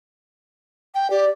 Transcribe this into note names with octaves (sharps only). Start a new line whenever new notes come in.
G5
G4 D5